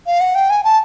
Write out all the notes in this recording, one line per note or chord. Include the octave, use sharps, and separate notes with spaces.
F5
F#5
G5
G#5
A5